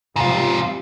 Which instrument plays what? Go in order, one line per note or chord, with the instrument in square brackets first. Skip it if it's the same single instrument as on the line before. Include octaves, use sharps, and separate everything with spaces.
[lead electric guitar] G#2 F4 [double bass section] C3 F3 G3